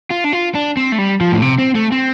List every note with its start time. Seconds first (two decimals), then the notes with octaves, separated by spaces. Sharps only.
0.10 F4
0.24 D4
0.33 F4
0.55 D4
0.77 C4
0.92 A3
0.98 G3
1.21 F3
1.32 A2
1.42 C3
1.59 C4
1.75 A3
1.92 C4